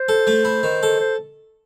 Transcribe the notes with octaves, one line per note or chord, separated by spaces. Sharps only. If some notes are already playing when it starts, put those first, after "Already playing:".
Already playing: C5
A4
A3
E4
D#3
A4
C5